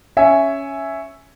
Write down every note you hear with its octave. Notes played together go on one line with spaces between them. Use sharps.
C#4 C#5 E5 G#5